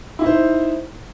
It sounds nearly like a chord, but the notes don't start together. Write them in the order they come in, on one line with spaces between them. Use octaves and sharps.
E4 D#4 C5